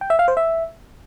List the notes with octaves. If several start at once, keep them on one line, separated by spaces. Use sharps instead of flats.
G5
E5
F5
C5
E5